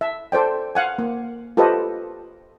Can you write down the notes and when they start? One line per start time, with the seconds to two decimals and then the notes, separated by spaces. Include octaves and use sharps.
0.01 E5
0.32 A4 C5 D5 G5
0.75 F5 F#5 G#5
0.98 A#3
1.57 F4 G4 A4 B4 C5 D#5